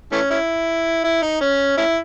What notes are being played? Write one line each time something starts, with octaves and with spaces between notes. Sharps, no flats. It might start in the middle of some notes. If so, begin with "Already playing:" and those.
E3 A3 C#4
C#4 E4
E4
D#4
C#4
C#4 E4